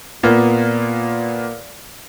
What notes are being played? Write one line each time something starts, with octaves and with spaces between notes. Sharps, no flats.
A#2 A#3 B3